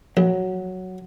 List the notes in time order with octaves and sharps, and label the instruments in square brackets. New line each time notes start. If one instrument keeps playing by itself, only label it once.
[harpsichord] A#1 [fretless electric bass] F#3